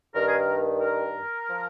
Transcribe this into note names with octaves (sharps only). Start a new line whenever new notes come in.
G2 D#3 A#4
G#4
A#4
A#4
F3